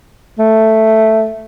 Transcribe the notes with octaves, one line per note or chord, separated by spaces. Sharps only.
A3